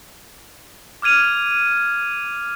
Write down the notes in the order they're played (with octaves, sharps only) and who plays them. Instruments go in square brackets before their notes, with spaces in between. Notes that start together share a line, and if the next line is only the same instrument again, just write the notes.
[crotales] D6 F6 G#6 D#7 F7